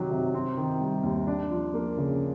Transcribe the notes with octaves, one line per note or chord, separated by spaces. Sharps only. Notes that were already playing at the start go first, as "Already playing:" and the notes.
Already playing: C3 D#3 F#3
C3
C4
D#3
G3
D#2
D4
F3
A#3
C#3